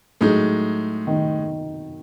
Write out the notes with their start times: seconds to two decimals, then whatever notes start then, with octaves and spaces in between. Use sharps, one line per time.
0.21 A2 F#3 G#3 D#4
1.07 D#3